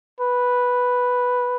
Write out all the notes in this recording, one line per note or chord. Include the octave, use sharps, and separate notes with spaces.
B4